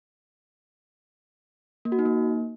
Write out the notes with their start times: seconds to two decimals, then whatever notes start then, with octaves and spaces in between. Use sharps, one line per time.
1.85 A#3
1.92 F#4
1.99 D#4
2.05 A#3